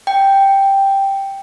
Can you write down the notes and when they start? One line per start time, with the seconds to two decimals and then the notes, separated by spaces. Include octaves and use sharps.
0.07 G5